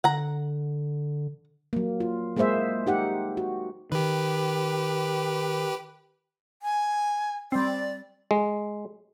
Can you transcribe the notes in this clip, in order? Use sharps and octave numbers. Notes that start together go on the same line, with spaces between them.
D3 F#5 A#5
F#3 A#3
F4
G#3 A#3 G#4 C5 E5
D#4 G4 F#5
F#4
D#3 G4 B4
G#5
G3 C4 D5
G#3